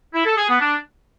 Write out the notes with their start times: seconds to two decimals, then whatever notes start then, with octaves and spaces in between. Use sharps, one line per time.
0.13 E4
0.25 A4
0.37 G#4
0.49 B3
0.60 D4